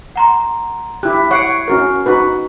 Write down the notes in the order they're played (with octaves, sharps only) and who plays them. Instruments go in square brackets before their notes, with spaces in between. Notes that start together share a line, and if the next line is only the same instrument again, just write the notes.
[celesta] F#5 A#5 C6
[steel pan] E4 G4 [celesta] F#6
[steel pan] C#5 F#5 [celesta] C#6 C7 D7
[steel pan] C#4 F#4 A#4
D#4 F#4 B4